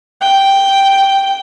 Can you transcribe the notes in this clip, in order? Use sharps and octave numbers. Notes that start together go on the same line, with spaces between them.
G5